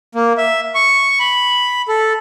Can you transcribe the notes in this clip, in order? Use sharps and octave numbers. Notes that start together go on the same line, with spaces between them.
A#3
E5
C#6
B5
A4